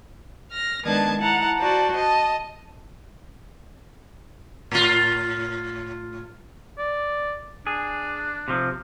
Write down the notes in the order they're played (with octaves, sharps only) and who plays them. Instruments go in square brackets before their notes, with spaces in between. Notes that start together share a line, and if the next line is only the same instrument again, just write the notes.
[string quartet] F6 A#6
D#3 G#3 B3 D4 A5 G#6
E4 F#5 A5 A#5
F#4 C5 D5 A5
D#5 A5
[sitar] A2 F4
[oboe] D5
[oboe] D4 [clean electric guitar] G#4
[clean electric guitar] C3 F3